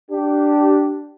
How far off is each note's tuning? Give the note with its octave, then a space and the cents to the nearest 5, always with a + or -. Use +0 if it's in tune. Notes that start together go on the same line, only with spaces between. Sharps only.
D4 +0 G4 -15